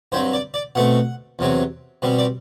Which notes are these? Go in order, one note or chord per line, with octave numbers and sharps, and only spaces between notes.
G2 F#3 C4 C5
D5
D5
B2 A3 C4 F#5
E2 C3 F#3 C4
B2 G3 C4
D5